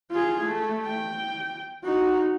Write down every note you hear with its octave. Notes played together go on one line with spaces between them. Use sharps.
F4 G#4
A3
G5
D#4 F#4